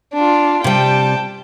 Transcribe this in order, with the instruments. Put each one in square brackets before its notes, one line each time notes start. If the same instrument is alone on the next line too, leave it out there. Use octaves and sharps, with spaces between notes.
[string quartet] D4 F4
[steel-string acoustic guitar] C3 G3 [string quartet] G5 A5